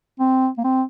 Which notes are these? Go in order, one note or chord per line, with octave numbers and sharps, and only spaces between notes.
C4
A#3
C4